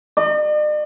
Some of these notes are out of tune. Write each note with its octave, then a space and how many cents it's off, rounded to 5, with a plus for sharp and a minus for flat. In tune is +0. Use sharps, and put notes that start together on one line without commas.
D5 +45